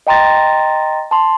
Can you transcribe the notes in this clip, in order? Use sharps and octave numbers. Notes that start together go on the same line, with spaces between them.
D#5 G5 A#5 C6 A6 A#6
A5 C6